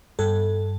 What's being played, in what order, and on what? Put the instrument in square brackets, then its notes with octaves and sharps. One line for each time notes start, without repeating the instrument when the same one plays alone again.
[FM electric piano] G2 A4